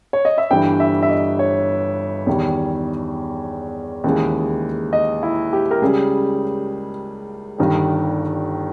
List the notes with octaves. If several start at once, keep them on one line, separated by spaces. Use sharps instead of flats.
C#5
D#5
E5
G1 G2 E3 G3 G5
E5
E5
D#5
C#5
E2 D#3 G3
D#2 C#3 E3 G#3
D#5
E4
G4
A#4
C#2 C#3 G3 G#4
G1 G2 D#3 G3